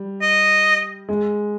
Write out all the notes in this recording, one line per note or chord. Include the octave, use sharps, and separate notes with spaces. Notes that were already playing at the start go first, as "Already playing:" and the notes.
Already playing: G3
D#5
G#3